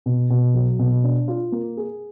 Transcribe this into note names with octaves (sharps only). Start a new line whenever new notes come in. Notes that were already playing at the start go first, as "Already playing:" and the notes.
B2
B2
F#3
B2
D4
F4
A#3
G#4